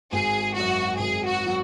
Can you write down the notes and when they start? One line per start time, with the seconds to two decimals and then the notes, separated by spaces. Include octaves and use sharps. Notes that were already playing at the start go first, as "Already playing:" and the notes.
0.12 G#1 G#4
0.55 F#2 F#3 F#4
0.99 G#1 G#4
1.28 F#4
1.46 F#3